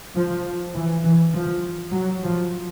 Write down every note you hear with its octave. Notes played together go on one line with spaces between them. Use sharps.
F3
E3
E3
F3
F#3
F3